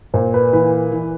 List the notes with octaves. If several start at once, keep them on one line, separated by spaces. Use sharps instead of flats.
A#2 C5
B4
E3 B4
E3